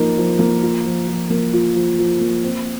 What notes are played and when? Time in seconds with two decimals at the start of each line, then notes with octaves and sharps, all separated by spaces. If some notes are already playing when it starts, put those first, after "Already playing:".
Already playing: F3 A#3 D#4 A#4
0.17 F3
0.39 A#3
0.62 F4
0.84 F3
1.07 F3
1.30 A#3
1.53 F4
1.75 F3
1.99 F3
2.21 A#3
2.44 C4